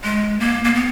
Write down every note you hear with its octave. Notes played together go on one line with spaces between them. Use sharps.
G#3
A#3
A#3
B3